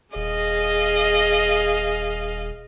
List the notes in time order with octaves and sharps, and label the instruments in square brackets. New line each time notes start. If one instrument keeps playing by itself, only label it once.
[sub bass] D#1 [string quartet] G#4 D#5 F5